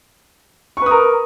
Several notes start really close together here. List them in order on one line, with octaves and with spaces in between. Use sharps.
C#6 B4 D#6 A#4